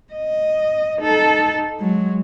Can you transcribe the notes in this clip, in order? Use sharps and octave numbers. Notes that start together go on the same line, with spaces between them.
D#5
D#4 A4
F#3 G#3